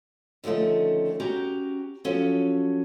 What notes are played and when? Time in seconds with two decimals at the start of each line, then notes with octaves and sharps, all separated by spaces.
0.44 D3 D#3 F3 A3 C#4
1.20 C#4 F#4 G4 A#5
2.04 F3 F#3 C#4 A4